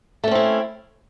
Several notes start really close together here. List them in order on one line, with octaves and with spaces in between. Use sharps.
A3 C#4 C4 E4